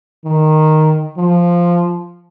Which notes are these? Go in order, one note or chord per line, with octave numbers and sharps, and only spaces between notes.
D#3
F3